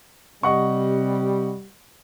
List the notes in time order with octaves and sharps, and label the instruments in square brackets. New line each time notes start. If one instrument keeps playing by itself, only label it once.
[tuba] C3 [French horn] G3 [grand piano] D#5 F#5 C#6